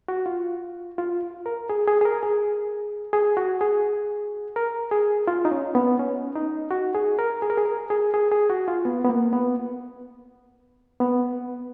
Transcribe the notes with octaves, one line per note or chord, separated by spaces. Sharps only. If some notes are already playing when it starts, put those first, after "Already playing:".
F#4
F4
F4
A#4
G#4
G#4
G#4
A#4
G#4
G#4
F#4
G#4
A#4
G#4
F4
D#4
C#4
B3
C#4
D#4
F#4
G#4
A#4
G#4
A#4
G#4
A#4
G#4
G#4
G#4
F#4
F4
B3
B3
A#3
B3
B3